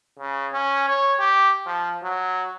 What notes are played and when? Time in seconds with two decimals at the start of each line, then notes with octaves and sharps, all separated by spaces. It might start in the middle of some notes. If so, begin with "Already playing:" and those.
0.19 C#3
0.53 C#4
0.88 C#5
1.20 G4
1.66 F3
2.03 F#3